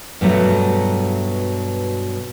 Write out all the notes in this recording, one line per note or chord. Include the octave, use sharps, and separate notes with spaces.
G2 B2 F#3 A3